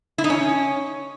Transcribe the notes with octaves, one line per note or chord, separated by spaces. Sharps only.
E4
D#4
C#4